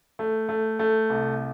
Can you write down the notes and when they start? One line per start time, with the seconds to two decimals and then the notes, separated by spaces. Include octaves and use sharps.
0.19 A3
0.49 A3
0.79 A3
1.10 C2